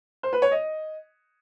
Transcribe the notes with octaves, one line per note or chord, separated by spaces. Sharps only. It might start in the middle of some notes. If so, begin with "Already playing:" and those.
C5
B4
C#5
D#5